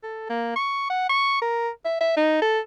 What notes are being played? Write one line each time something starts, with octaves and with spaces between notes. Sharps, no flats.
A4
A#3
C#6
F#5
C#6
A#4
E5
E5
D#4
A4